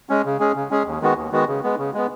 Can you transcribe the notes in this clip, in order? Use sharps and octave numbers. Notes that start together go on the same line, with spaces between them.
G#3 C#4
C#3
G#3 C#4 G#4
C#3
G#3 C#4 G#4
D#2
D#3 G#3 B3 F#4
D#2
D#3 G#3 B3 F#4
C#3
G#3 B3
C#3
G#3 B3